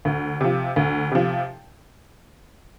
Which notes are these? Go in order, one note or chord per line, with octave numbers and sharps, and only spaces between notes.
D2
C3 F3
D2
C3 F3